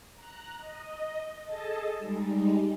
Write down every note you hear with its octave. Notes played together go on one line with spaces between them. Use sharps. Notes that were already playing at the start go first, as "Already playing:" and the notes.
A#5 F#6
D#5
G#4 A4 D#5 A5
G3 G#3 D#4